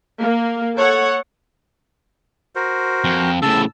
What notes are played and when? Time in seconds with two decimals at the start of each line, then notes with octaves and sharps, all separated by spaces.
0.21 A#3
0.75 A4 C#5 F#5
2.55 F#4 A#4 C5
3.04 F2
3.42 A2 C#3 A5 E6